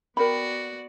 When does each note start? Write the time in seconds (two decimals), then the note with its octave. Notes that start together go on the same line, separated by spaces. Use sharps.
0.17 B3 F#4 A#4 D5 G5 B5